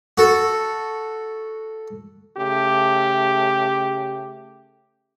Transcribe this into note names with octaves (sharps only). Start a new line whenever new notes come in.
F#4 A4
C#3 A3 G4